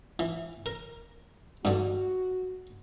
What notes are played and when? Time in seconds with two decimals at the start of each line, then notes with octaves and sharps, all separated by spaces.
0.19 E3
0.66 A#4
1.65 G2 D3 F#4